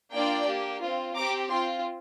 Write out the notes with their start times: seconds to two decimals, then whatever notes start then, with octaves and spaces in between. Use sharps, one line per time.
0.12 A#3 D4 F4 D5 G5
0.46 A#3 G4
0.82 C4 F4
1.15 C4 G4 A#5 D6
1.49 C4 F4 G5 C6